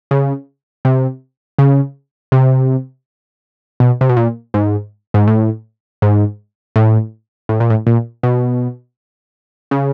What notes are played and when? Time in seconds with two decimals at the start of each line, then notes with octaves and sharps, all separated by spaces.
0.11 C#3
0.85 C3
1.59 C#3
2.32 C3
3.80 B2
4.01 C3
4.09 B2
4.17 A#2
4.54 G#2
5.14 G#2
5.28 A2
6.02 G#2
6.76 A2
7.49 A2
7.60 A#2
7.70 A2
7.87 A#2
8.23 B2
9.71 C#3